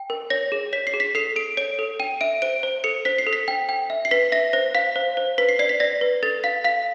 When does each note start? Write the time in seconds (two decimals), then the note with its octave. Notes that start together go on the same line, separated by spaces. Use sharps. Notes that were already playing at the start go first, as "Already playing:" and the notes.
Already playing: G5
0.10 A#4
0.30 C#5 A#6
0.52 G#4
0.73 C#5 B6
0.87 C7
0.93 G#4
1.00 B6
1.15 A4 C7
1.36 A4 D7
1.57 C#5 D7
1.79 A4
2.00 G5 D#7
2.21 E5 D7
2.42 C5 D7
2.63 C5
2.84 A4 C#7
3.05 C5 B6
3.18 C7
3.27 A4
3.33 B6
3.48 G5
3.69 G5
3.90 E5
4.05 C7
4.11 B4 B6
4.32 E5 A#6
4.53 C5 A#6
4.75 F5 B6
4.96 C5
5.17 C5
5.38 B4 B6
5.49 C7
5.59 D5 C7
5.69 B6
5.80 D5 A#6
6.01 B4
6.23 A4 A6
6.44 F5 B6
6.64 F5 B6